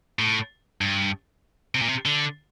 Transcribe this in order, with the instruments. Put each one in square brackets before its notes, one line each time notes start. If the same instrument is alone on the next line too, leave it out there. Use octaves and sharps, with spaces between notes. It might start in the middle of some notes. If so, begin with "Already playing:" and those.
[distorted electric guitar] A2
G2
C3
A#2
C3
D3